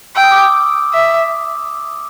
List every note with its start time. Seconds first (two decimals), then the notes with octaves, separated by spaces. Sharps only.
0.16 G5 E6
0.24 D#6
0.31 D6
0.37 D#6
0.56 E6
0.94 E5